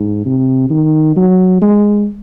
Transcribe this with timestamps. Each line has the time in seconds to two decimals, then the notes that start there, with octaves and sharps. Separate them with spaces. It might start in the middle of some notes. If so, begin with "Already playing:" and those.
Already playing: G#2
0.25 C3
0.70 D#3
1.16 F#3
1.62 G#3